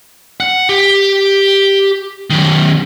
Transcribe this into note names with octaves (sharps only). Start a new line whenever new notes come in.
F#5
G4
F#2 D#3